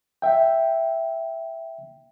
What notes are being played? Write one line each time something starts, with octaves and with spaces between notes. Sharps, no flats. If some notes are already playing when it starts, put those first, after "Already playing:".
E5 G5